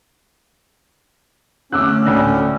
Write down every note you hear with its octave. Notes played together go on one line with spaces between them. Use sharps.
D3 A3 C#4 D6 E6 F#6
D2 A2